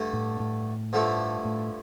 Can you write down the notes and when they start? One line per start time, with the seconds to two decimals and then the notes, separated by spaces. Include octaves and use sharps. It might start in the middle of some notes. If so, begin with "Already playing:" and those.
Already playing: G2 D3 A3
0.13 A2
0.40 A2
0.93 G2 D3 F3 A3 E4
1.45 A2